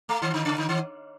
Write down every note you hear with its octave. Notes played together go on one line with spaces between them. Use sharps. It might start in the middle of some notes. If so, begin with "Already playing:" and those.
A3
D#3
D3
C#3
D3
D#3